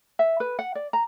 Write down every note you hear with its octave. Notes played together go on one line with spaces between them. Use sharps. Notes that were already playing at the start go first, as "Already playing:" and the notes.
E5
B4
F#5
D5
A#5